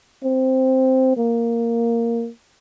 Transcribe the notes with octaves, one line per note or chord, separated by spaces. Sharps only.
C4
A#3